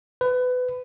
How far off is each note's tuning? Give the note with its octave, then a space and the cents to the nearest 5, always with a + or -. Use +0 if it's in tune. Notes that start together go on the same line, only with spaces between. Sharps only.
B4 +25